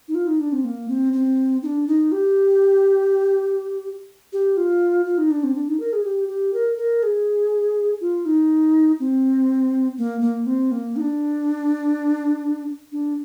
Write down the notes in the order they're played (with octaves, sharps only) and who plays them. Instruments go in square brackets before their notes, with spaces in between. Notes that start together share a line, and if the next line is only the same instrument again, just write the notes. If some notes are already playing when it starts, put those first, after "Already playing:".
[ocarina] D#4
F4
D#4
D4
C4
A#3
C4
C4
D#4
D4
D#4
G4
G4
F4
F4
D#4
D4
C4
D4
D#4
A#4
G#4
G4
G4
A#4
A#4
G#4
F4
D#4
C4
A#3
A#3
C4
A#3
D#4
D4
D4